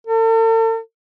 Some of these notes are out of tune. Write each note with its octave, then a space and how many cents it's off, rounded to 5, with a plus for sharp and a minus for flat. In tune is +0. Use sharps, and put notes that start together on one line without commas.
A4 +45